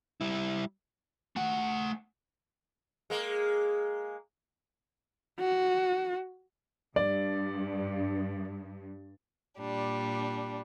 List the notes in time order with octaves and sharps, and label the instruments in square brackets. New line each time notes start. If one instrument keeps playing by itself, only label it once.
[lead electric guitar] G3 E4
[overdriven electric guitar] A3 F#5
[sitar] G#3 A#3
[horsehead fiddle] F#4
[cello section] G2 [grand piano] D5
[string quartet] A#2 G3 D4